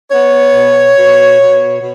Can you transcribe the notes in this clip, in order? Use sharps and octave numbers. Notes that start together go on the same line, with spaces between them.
B3 C#5
B2
B2
B2
B2